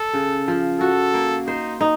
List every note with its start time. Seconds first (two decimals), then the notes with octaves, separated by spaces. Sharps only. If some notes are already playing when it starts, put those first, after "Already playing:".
Already playing: A4
0.13 C#3
0.48 F3
0.80 F#4 A4
1.14 A#3
1.47 D#4 C5
1.81 D#4